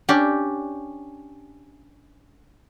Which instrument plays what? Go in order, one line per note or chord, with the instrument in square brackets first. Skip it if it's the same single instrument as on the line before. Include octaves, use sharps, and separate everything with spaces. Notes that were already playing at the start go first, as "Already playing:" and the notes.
[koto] C#4 D4 G4